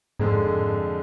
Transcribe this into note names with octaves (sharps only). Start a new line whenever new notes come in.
F2 G#2 D3 G#3